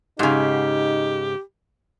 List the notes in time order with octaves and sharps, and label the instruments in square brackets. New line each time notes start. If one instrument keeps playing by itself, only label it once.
[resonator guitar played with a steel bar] G#2 C#3 [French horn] D#4 [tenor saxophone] G4